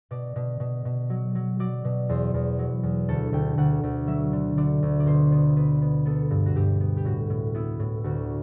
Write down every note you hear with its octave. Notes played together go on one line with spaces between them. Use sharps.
B2 D5
B2
B2
B2
F#3
F#3
F#3 D5
B2
E2 C5
E2
F#3
E2
D2 A4
D2 G5
D2 F#5
D2
F#3 E5
D3
D3 D5
D2
D5
B2 C5
B3
B3 B4
B3
B3 A4
G2
F#4
G2 G4
B3
G4
A2 F#4
A2
B3 E4
A2
D2 F#4